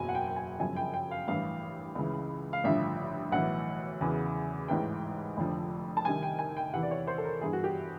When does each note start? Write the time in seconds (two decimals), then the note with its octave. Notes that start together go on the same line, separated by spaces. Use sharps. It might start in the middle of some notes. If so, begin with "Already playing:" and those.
Already playing: F#1 E2 B2 F#3 G#5
0.09 F#5
0.15 G5
0.27 G5
0.36 G#5
0.59 G1 F#2 C#3 F3 G#5
0.76 G5
0.94 G5
1.11 F5
1.28 A1 G2 E3 F5
1.95 C#2 C#3 E3
2.53 F5
2.64 A1 G2 D3 F3 E5
3.32 B1 A2 E3 F#5
4.01 E2 C#3 E3
4.68 A1 G#2 E3 G5
5.37 F1 F2 D3 F3
5.97 A5
6.05 C2 C3 D#3 G#5
6.23 G5
6.39 G#5
6.57 G5
6.73 E2 C3 E3 F#5
6.83 D5
6.91 C#5
7.07 C5
7.18 A4
7.24 A#4
7.41 G1 G2 E3 G#4
7.53 F#4
7.64 G4